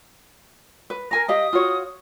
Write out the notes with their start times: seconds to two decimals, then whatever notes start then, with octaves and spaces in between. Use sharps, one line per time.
0.90 B4
1.11 A#4 G#5 A#5 A#6
1.28 G4 D#5 F5 D#6
1.53 F4 F#4 C#5